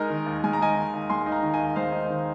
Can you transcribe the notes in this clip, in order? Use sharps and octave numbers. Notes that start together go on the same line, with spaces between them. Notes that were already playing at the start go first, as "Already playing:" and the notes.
Already playing: G#3 D#4 A#4 D#5
D#3
D#2
G#3 G#5
A#5
D#4 D#5 G#5
D#3
D#2
G#3 G#5 C6
D#4
F5 A#5
D#3
D#5 G#5
D#2
G#3 C5 F5
D#4
D#3